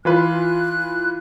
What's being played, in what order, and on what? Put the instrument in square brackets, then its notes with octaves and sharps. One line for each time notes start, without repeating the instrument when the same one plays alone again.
[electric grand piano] E3 F4 B4 [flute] F#6